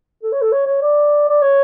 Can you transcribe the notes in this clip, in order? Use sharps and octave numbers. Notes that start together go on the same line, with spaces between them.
A4
C#5
A4
C#5
C#5
D5
D5
C#5